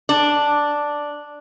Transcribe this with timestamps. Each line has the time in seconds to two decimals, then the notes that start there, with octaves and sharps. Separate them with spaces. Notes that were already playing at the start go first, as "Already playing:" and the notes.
0.09 D4